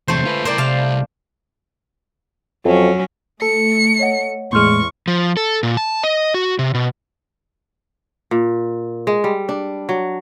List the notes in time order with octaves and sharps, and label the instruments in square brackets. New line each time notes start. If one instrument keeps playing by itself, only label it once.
[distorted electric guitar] E2 C3 [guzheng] A3 C5
[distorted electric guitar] F4 B4
[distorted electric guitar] E4 A#4 [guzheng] C5 D5
[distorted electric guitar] C2 [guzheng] F5 A5
[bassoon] F2 [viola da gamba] F#3 C#4
[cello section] A3 [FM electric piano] A4 [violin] C#7
[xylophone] C#5 D#5 F#5
[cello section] E2 [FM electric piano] A2 G#3 [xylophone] C6 F6 C#7 [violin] C#6
[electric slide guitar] F3
A4
A#2
A5
D#5
F#4
C3
B2
[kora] A#2
G#3
G3
D4
F#3